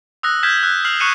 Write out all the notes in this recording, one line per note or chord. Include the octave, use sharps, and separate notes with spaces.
D#6 E6 F#6 A#6
F6 G6 G#6 B6 E7
E6 F#6
F6 C7 F7 F#7
C#6 F#6 C#7 D#7 E7